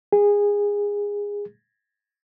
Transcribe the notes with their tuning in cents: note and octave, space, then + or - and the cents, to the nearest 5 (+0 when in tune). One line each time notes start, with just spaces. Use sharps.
G#4 -20